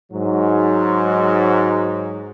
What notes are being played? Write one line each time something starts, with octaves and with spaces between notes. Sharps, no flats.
G#2 F#3